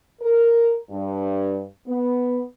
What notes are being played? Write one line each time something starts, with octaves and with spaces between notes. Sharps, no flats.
A#4
G2
B3